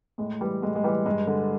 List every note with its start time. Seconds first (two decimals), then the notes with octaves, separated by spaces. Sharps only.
0.18 A2 G#3
0.41 E3 G3
0.62 A2 G#3
0.76 G#3
0.84 E3 G3
1.06 G2 G#3
1.27 D3